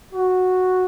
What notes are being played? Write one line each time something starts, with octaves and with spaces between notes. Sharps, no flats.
F#4